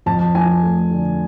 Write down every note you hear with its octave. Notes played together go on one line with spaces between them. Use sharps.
F2 A5
F3 G#5
A3
D3